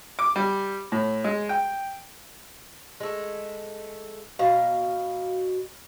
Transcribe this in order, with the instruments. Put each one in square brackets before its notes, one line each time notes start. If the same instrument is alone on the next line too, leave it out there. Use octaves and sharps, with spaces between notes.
[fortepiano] D6
G3
A2
G#3
G5
[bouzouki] G#3 A3
[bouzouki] B2 A#4 [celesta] F5